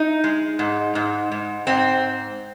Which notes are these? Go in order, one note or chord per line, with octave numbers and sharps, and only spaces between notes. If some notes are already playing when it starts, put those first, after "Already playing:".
Already playing: D#4
G#3
G#2
G#2
G#2
G#2 C4